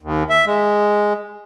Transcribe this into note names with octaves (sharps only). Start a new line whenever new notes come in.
D#2
E5
G#3